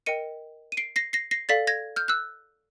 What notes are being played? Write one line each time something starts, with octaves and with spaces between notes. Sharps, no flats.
A#4 D#5 G5 C#7 D#7
D#7
C7 D7
A#6 C7
A#6 C7
A#6 C7
A4 D5 F5 A6 B6
G#6 A#6
F6 G6
E6 F#6